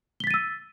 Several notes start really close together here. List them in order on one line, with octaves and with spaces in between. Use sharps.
G7 B6 A6 D#7 E6